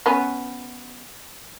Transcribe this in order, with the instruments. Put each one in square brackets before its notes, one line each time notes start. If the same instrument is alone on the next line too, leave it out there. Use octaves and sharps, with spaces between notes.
[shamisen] B3 C#4